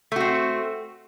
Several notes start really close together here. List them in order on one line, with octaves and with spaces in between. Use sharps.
A3 F#4 C4